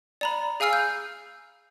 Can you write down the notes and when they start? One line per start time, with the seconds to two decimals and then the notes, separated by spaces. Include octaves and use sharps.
0.21 D5 A#5 B5
0.60 G#4 F5 G#5 E6 F6 C7
0.73 G6